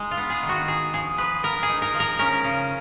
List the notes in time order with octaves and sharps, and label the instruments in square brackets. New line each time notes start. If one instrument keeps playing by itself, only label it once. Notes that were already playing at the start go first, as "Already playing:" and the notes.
Already playing: [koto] G#3 D#4 G#4
F4
B3
G#4
D#3
F#4
D#4 G#4
F3 G#4
F3 B4
B3 A#4
G#4
D#4
A#4
F3
A#4
C#4 A#4
C#3